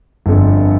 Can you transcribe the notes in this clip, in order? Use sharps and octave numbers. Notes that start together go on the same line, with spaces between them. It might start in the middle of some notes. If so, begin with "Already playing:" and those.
G1 F2 D3